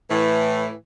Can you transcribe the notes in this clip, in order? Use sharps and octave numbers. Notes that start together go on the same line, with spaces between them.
A2 E3